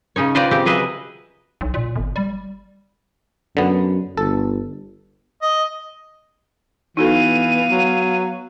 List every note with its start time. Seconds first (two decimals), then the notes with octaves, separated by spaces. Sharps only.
0.16 C#3 C#4 D#4 C#5
0.35 F4 B4 C5 D5 D#5 G5
0.51 C#3 C4 G4
0.66 F#3 G#4 B4 D#5 E5
1.61 B1
1.74 A#2
1.96 G1
2.16 G3
3.57 F#2 D3 B3
4.17 G1 A4
5.42 D#5
6.97 E3 B3 D#4 F#4 A4 F5 D#7
7.70 F#3